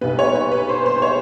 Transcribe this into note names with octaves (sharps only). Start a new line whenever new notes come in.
B1 A#2 G3 B3 B4
C#5
C#5
B4
C5
C5
C5
C#5